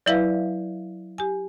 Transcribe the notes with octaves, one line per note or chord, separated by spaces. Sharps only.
F#3 E4 B4 D5 E5 F5
G4 G#5